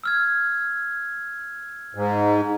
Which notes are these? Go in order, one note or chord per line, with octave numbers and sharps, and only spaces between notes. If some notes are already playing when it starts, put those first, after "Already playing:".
E6 F6 G#6
G#2